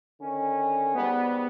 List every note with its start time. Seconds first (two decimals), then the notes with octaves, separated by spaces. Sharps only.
0.20 D3 D#3 C#4
0.95 G#2 G3 B3